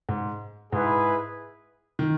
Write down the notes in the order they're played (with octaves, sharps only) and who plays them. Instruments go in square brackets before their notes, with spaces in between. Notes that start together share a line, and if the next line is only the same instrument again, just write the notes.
[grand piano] G#2
[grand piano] G#2 [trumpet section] E4 G#4 B4
[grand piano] D#3